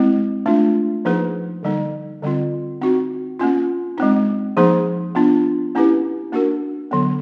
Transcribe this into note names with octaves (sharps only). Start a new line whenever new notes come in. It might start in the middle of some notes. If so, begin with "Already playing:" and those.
Already playing: G#3 C4 E4
A3 D4 F4
F3 A#3 D#4 G#4 B4
D3 G3 A#3 D#4
D3 G3 C4 F4
C4 D#4 F#4
A#3 C#4 F4
G#3 C4 D#4
F3 A#3 D#4 G#4 C5
B3 D4 F4
A#3 C#4 E4 G4 B4
A#3 D4 F#4 A#4
D3 F#3 B3